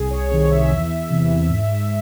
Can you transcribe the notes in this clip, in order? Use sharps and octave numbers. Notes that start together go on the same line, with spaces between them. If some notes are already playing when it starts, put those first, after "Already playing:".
Already playing: C2 G#4
C#5
C3 D#3 C#5
E5
E2
C3 E3
G#2